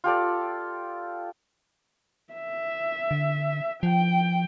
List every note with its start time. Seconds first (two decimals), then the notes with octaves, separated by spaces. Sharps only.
0.04 F4 G4 A4 D5
2.33 E5
3.11 D3
3.83 F3 G5